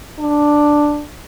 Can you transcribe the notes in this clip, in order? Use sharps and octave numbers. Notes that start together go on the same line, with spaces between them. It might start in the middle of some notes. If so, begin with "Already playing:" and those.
D4